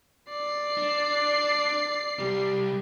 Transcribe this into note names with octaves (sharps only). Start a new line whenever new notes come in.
D5 C7
D4
C2 G3